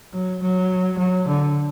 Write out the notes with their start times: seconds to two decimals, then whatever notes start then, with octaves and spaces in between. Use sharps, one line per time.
0.13 F#3
0.42 F#3
0.98 F#3
1.27 D3